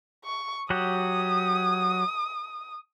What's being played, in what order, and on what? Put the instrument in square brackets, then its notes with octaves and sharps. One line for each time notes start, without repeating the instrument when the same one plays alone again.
[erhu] C#6
[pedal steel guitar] F#3 F#4 G4 [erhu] D#6